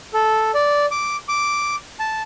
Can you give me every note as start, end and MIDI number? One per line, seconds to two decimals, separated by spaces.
0.14 0.51 69
0.54 0.86 74
0.91 1.16 86
1.28 1.75 86
2.00 2.22 81